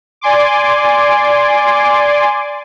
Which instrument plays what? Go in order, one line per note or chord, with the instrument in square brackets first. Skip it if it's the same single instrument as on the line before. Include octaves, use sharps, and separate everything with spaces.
[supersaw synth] D5 G#5 C6 D6